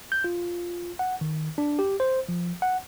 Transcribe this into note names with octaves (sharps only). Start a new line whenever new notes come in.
G6
F4
F#5
D#3
D4
G4
C5
F3
F#5